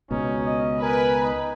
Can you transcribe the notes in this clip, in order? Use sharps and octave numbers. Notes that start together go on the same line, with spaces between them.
C#2 B2 C#4 D#4
D#5
A#4 B4 G#5
D#4